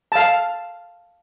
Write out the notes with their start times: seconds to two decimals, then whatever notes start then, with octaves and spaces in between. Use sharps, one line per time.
0.12 F5 A5